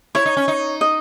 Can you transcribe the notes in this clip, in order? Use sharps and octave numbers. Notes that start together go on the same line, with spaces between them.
E4 C#5
D#4
C#4
D#4
D#5